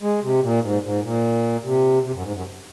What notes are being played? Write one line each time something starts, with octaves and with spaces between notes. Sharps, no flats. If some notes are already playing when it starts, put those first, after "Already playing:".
G#3
C3
A#2
G#2
G#2
A#2
C3
C3
F#2
G#2
F#2